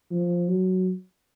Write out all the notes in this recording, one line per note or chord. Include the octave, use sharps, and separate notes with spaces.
F3
F#3